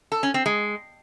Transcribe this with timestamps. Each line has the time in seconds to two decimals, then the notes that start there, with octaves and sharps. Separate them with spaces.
0.12 A4
0.23 C#4
0.34 C4
0.46 G#3